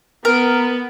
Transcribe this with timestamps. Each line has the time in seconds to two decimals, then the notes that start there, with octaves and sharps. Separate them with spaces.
0.25 B3 A#4